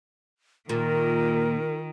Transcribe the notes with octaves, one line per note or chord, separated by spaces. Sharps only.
A#2 D#3 A#4